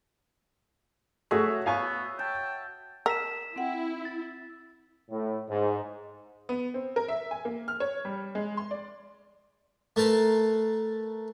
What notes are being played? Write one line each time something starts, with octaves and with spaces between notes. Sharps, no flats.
A3 F#4 G#4 C#5 E5
B3 F5 G#5 C#6
G5 A5
A#4 A5 E6 B6 E7
C4 E4 F#5 G5
A6
A2
G#2
B3
C4
A#4
E5
G#5
A#3
F6
C#5
G3
G#3
C6
D5
A3 A#4 B4 A5 C6